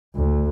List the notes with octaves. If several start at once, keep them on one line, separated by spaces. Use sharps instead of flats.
D2